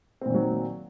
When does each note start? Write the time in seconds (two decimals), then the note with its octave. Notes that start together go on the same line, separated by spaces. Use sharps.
0.21 C4
0.26 A#2
0.30 D#3
0.34 F#3